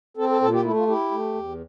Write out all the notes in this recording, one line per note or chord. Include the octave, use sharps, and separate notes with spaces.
C4 A4
A4
A#2 A4
G4
A3 E4
F4
E4 G4
A3
E2